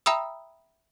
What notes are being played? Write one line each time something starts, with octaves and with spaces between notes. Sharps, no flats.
E5 G5 A#5 B5 D#6 E6